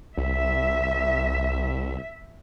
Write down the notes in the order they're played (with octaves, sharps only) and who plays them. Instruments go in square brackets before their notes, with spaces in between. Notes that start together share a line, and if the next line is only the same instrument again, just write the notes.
[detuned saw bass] C2 [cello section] E5